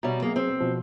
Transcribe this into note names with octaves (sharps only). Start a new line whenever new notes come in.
B2 G3 C#5 E5 A#5
F#3 A#3 G#4
C4
B2 F3